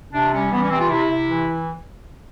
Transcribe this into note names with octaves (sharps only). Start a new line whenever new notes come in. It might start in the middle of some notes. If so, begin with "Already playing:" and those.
C3 D4
G3 C#4
E3 B3
C#4
C3 C4
F4
C3 E4
C3
E3